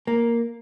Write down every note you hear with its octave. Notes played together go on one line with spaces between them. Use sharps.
A#3